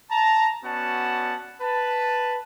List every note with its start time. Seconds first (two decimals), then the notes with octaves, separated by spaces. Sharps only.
0.11 A5 A#5
0.64 B3 C#4 F#4 D5 F#5 A5
1.61 B4 A5